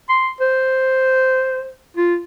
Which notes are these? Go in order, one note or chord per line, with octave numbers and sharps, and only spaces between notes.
C6
C5
F4